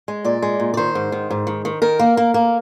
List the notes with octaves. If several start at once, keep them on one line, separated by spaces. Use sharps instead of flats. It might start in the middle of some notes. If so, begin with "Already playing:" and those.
G#3
A#2 D5
G#3
A#2
D5
D#3 C5
G#2
D#3
G#2
D#3
D#3
D#3 A#4
A#3
A#3
A#3